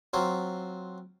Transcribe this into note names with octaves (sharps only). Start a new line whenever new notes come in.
F#3 C4 F4